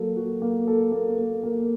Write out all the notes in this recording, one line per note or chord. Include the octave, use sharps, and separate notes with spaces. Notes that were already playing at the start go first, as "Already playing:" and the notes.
Already playing: F#3 A#3 A4
F#4
A#3
A4
A#3
A#3
A#3